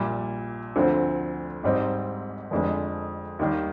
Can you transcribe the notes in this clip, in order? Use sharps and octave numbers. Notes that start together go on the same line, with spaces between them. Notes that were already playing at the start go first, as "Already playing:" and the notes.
Already playing: A#1 A#2 G3
D2 D3 F3 C4
G#1 G#2 G3 C4 D#4
F1 F2 D3 G#3
D#2 D#3 G3